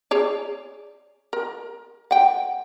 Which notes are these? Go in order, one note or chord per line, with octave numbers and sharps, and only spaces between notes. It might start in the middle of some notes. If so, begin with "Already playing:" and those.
G#4 C#5 D5
A#4
F#5 G5